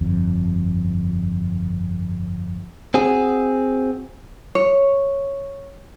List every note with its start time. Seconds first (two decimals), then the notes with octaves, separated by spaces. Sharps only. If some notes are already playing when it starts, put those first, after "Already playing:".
0.01 G1 F2
2.94 C4 F#4 G#4
4.55 C#5